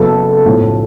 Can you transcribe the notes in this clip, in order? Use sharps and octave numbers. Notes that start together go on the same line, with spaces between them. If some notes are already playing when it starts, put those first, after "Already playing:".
Already playing: F#1 F#2 C#3 F#3 B3 A4
B1 A2 F3